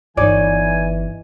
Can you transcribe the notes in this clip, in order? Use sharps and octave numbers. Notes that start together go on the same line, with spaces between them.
G1 E3 D#4 C#5 D5 G#5